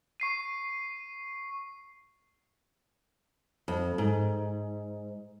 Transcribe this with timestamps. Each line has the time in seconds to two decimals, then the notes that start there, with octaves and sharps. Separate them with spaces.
0.20 C#6 C7 D#7
3.68 F2
3.98 G#2